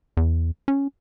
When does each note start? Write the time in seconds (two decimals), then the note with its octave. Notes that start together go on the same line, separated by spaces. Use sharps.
0.17 E2
0.68 C#4